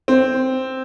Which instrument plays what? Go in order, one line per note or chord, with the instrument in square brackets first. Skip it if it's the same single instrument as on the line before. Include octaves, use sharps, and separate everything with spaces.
[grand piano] C4